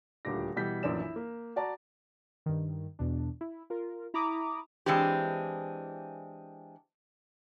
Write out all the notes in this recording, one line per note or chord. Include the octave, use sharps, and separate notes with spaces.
D#1 D2 F4 G4 D6 A#6
B2 E3 G3 G6 B6
A#1 F#2 E3 D5 E7
E4
A#3
F#4 D5 A5 A#5
G2 D#3
E2 B2 D4
E4
F4 A#4
E4 A#5 B5 D6 D#6
E3 G#3 C4 D4 G4